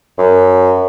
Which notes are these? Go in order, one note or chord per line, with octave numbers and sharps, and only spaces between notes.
F#2